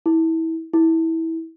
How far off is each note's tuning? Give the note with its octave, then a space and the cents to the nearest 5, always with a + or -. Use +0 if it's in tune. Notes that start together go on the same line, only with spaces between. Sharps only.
E4 -25
E4 -20